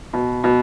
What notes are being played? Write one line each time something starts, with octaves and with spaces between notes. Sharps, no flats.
B2
B2